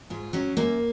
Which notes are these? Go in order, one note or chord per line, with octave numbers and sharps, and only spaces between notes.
G#2 F4
F#3 C#4
F#2 A#3